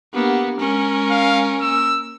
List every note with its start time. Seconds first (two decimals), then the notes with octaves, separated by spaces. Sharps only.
0.14 A#3 B3 D4 G4 F#5
0.60 G#3 C#4 A#4
1.10 F5
1.61 A#3 E6